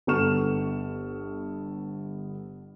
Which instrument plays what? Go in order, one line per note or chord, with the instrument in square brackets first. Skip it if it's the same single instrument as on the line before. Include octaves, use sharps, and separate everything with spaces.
[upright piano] G1 B3 A4 C#6 F6 E7